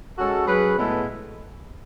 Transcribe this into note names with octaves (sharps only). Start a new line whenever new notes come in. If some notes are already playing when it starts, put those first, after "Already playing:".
G#3 C#4 F#4 A4
F#3 C#4 G#4 B4
A2 G#3 B3 E4 A4